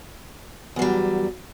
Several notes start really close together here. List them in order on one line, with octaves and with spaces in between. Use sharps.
E2 F#3 G3